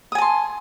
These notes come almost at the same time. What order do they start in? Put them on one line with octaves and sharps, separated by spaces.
D#6 G#5 A5 C6